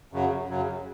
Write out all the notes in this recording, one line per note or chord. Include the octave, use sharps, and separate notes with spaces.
F#2 C#3 F#3
F#2 C#3 F#3